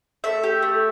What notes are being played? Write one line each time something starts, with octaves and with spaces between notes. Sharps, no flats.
A3 E5
G4
A3